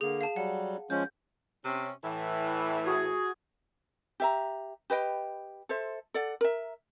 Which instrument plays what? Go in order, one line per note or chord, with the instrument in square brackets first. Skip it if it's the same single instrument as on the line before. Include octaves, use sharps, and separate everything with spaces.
[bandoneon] D3 A#3 [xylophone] G#4
[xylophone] F5 A5
[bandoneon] F#3 G3 [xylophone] F#5
[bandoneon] F3 G#3 C#4 [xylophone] G6
[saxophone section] C3 C#4
A2 E3
[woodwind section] F#4 G#4
[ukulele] G4 E5 A#5
G4 B4 D#5 G5
A4 C5 E5
A4 D5 F#5
A#4 E5